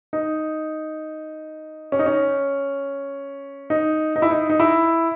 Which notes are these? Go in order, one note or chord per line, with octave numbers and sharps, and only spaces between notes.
D#4
C#4
D#4
C#4
D#4
D#4
E4
D#4
D#4
E4